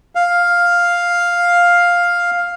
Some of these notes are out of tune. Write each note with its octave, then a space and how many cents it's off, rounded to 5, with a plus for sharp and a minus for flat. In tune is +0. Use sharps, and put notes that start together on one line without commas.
F5 +5